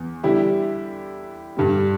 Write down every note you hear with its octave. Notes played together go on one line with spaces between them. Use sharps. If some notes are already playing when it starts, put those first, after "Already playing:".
Already playing: E2
D3 G3 E4 G4
G2 D3 G3